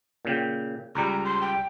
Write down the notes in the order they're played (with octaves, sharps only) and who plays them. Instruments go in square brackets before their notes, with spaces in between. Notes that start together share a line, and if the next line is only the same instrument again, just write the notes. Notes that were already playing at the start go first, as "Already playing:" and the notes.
[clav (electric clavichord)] A#2 C#3 G5
[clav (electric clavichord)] C#2 G3 [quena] A#5
[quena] C6
G5